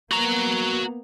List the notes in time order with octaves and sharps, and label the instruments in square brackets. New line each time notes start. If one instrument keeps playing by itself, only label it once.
[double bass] A#3 B3 [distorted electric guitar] F#4 A#5